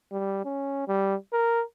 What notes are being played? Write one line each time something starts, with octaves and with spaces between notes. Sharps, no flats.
G3
C#4
G3
A#4